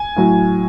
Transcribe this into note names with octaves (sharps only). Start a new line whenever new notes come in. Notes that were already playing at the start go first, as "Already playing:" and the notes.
Already playing: G#5
A2 F#3